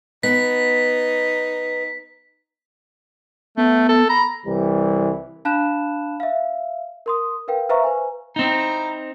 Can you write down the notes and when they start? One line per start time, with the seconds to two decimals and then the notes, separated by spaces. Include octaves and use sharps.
0.23 B3 D#4 B6
3.57 A3 B3
3.89 A4
4.09 A#5 B5
4.46 C2 E3 G3
5.45 D4 F5 A5 B5 F#6 E7
6.20 E5 F5
7.06 A#4 C6 D#6
7.48 A#4 B4 F5 G5
7.69 B4 C5 E5 F5 A#5 C#6
7.84 B4 C5 G#5
8.36 C4 D#4 E4 A#5